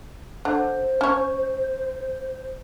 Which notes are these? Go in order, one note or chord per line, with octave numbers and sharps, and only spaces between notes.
D3 C5
C#4 C#5